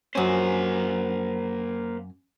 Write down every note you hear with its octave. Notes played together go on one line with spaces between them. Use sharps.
F#2 A#3 C#4 C5